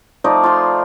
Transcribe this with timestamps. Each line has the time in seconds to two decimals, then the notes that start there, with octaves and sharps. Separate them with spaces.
0.24 F3 A3 D#4 D5
0.44 F4 C6